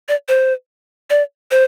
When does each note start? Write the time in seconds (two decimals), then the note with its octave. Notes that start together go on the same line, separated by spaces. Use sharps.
0.09 D5
0.28 C5
1.10 D5
1.51 C5